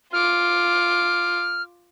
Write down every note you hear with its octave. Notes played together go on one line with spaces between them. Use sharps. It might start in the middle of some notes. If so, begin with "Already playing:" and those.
F4 D6 F6